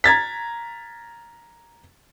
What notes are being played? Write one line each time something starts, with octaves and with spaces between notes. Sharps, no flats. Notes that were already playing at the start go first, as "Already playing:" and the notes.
A#5 G#6 A6 B6